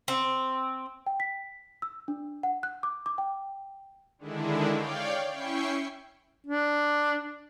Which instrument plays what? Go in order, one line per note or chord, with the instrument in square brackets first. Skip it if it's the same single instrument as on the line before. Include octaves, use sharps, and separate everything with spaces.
[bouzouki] C4
[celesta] G5
B6
E6
D4
F#5
F#6
D6
D6
G5
[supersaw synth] D3 D#3 G#3 D4 E4
C#5 D5 F5 G5
C#4 E4 G5 C#6 C7
[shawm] D4